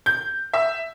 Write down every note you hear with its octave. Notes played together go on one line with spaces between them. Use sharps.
G6
E5